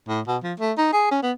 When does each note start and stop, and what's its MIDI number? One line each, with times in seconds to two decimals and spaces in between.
0.08 0.21 45
0.27 0.37 47
0.43 0.54 53
0.59 0.72 57
0.78 0.90 63
0.93 1.07 68
1.11 1.18 61
1.23 1.32 59